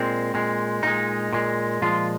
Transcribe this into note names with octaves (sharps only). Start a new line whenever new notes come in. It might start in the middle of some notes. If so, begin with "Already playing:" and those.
Already playing: A#2 G#3 C4
A#2 G#3
A#2 G#3 D#4
A#2 G#3
A#2 F3 G#3 F4